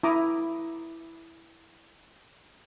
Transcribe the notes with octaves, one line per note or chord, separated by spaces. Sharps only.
E4 A#5 D6 D#6